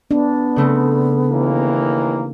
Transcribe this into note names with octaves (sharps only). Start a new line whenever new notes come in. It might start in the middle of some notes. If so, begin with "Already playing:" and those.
B3 D4
C#3 A3 C4
D#2 E3 A#3